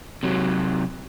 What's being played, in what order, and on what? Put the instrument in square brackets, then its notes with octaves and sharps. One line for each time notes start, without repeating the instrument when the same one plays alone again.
[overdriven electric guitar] C3 F#3